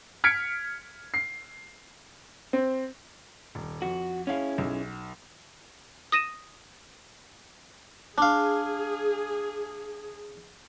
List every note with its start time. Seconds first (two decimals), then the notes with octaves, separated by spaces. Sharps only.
0.24 F6 G#6 B6 C#7 D7
1.14 C7
2.53 C4
3.55 D#1
3.82 F2 F#4
4.27 C#4 E4 G#4 C#5 F5
4.58 B1
6.12 D#6 A#6 D#7 E7
8.18 D4 G#4 F5